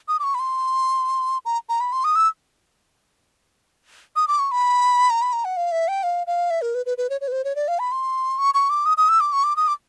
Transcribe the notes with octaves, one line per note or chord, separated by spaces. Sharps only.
D#6
D6
C#6
B5
C6
A#5
A#5
B5
C6
D#6
E6
D#6
D6
C#6
B5
A#5
B5
A#5
F#5
F5
E5
G5
F5
F5
E5
A#4
B4
B4
B4
C#5
C#5
B4
C5
C#5
D5
F5
B5
C6
C#6
C#6
D6
D#6
D#6
E6
D6
C#6
D6
D#6
D6